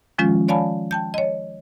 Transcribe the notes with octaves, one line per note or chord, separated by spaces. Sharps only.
D#3 F3 G#3 C#4 F4
C#5 D5 F5 G#5 A5 B5
G5 A5 G6
C#5 D#5